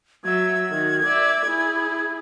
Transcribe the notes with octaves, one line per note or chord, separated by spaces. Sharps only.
F#3 E5 G#6
D#3 F#4
D5 E5
E4 G#4